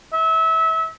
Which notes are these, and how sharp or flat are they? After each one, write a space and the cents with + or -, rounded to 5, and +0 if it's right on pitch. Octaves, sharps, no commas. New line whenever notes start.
E5 -30